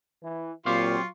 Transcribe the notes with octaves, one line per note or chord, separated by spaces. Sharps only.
E3
A#2 F#3 C4 F4 G4 F5 C6 C#6